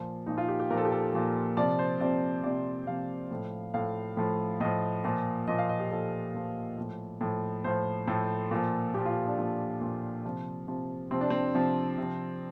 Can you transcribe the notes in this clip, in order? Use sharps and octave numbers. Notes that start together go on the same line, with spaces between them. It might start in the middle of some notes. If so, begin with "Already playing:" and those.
Already playing: A#2 F3
A#2 F3 D#4
F4
G4
G4
A#2 F3 A4 A#4
G4
A4
A#2 F3
C3 F3 D5
C5
C3 F3 D5
C3 F3 D5
C3 F3 F5
A2 F3
A2 F3 F5
A2 F3
A2 F3 D#5
A#2 F3
A#2 F3 D#5
F5
D#5
G4
A#2 F3 A4
A#2 F3
A2 F3
A2 F3
A2 F3 C5
A2 F3 A4
A#2 F3
A#2 F3 G4
F4
D4
A#2 F3 A#3
A#2 F3
C3 F3
C3 F3
C3 F3 C4
D4
C4
C3 F3
C3 F3